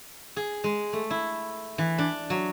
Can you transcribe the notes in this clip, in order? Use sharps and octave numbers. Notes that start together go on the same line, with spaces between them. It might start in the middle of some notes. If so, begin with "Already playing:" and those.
G#4
G#3
A3
E4
E3
D4
F#3